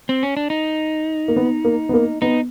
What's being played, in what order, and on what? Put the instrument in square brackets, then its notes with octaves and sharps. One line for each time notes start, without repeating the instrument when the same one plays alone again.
[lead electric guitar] C4
C#4
D4
D#4
[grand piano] A#3
B3
A#3
B3
A#3
[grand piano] B3 [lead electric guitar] D#4